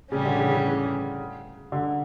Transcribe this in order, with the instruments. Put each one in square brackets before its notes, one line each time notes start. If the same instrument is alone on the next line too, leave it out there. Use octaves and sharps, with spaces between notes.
[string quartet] A2 E3 G3 C#4 [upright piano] C#3
[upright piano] D3
C#3
C#3
D3